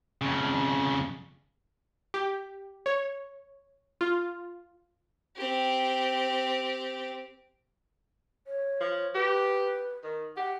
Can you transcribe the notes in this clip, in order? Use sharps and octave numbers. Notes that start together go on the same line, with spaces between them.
F2 C#3
G4
C#5
F4
C4 G4
C#5
F3
G4 B4
D#3
G4 F#5